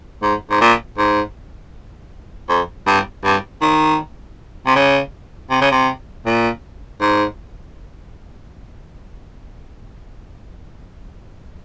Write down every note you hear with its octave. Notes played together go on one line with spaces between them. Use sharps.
G#2
G#2
A#2
G#2
F2
G2
G2
D#3
C3
C#3
C3
C#3
C3
A#2
G#2